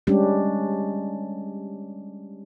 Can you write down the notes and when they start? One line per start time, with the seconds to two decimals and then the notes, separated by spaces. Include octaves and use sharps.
0.07 G3 G#3 C#4 D4 G4